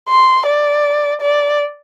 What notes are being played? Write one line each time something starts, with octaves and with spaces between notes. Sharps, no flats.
C6
D5
D5